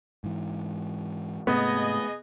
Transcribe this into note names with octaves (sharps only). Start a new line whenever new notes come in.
G#2 E3
G#2 C3 A3 B3 G#4 D#5